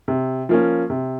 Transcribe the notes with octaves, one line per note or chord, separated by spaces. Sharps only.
C3
F3 A#3 C#4
C3